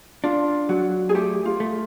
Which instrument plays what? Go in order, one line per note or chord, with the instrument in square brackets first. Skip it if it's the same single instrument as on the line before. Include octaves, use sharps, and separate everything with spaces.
[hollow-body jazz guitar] D4 [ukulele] F4
[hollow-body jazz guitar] F#3 [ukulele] F#4
[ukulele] G#4
[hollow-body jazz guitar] A3 [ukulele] G4
[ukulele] F4
[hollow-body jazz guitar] A3